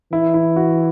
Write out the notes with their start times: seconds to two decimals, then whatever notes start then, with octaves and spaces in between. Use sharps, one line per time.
0.12 E3 E4
0.34 E4
0.56 F#4